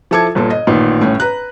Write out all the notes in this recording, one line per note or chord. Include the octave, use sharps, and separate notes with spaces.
F3 E4 A4 D6 G#6
G1 A#2 A4
D#5
A1 A#2 D#3
G1 A2 C#4
B4 A#5 F#6